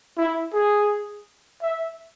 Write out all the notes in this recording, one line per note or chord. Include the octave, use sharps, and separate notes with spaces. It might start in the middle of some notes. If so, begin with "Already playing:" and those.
E4
G#4
E5